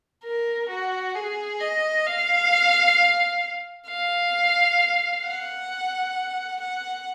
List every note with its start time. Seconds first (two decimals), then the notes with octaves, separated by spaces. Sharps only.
0.24 A#4
0.69 F#4
1.15 G#4
1.61 D#5
2.07 F5
3.89 F5
5.24 F#5
6.61 F#5